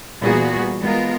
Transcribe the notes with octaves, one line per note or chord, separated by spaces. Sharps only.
A#2 E3 G3 B3 F#4 G#4
G#3 B3 F4 A#4